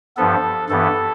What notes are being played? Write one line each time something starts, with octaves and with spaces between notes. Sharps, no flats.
G2 F3 B3 A4
G2 E3 B3 A4